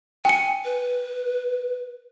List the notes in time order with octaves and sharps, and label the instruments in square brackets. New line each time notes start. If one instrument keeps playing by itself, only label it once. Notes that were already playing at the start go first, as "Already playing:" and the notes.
[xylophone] G5 C#7 [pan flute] G#5
[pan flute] B4